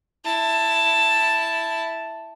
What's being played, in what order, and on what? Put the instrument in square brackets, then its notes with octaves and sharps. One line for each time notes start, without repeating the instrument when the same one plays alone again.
[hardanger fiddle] E4 A5